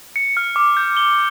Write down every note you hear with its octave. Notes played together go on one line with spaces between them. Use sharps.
C#7
F6
D6
G6
G7